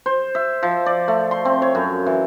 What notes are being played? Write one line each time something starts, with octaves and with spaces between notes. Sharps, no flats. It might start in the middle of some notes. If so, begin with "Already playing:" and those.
C5
E5
F3
D5
A3
C6
C4
C#5
F#2
E3